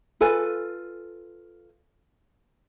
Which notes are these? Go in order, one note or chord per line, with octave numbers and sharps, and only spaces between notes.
F4 A4 B4 G#5